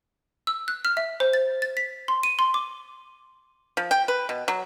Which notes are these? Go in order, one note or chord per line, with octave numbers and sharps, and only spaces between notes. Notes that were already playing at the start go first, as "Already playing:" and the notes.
E6
F#6
F6
E5
C5
A6
A6
B6
C6
D#7
C6
D6
F3
G5
B4
B2
F#3